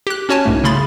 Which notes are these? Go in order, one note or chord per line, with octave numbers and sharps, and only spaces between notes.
G4 F#6
C#4 F#4 C#5 G#5 A5
C2 G#2 A3
C#3 A3 G#4 B5 C6 A6